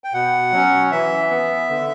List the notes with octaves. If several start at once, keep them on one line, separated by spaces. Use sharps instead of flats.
G5
B2 F#5
F#3 C#4
E3 E5
B3
D3